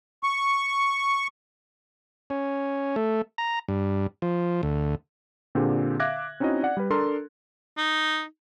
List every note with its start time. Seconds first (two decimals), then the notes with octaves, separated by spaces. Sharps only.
0.23 C#6
2.30 C#4
2.96 A3
3.38 A#5
3.69 G2
4.22 F3
4.63 D2
5.55 A#2 D3 C4 G4 G#4
6.00 E5 F5 D6 F#6 G#6 A#6
6.40 C4 C#4 D#4 E4 F#4 D#5
6.63 D5 F#5
6.77 G3 B4
6.90 D4 A4 A#4 C6
7.78 D#4